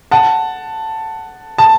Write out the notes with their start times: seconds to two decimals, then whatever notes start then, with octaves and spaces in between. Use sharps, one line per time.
0.11 F#5 A5
1.58 A5